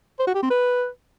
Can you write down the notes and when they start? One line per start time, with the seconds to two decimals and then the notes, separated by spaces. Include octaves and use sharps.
0.19 C5
0.27 F#4
0.35 G4
0.43 C4
0.50 B4